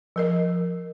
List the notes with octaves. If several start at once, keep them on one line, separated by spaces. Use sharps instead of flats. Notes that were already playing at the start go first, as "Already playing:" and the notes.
F3 A#4 D#5